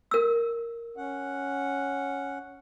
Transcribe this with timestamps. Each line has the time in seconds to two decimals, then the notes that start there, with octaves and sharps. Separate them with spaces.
0.11 A#4 E6
0.97 C#4 F#5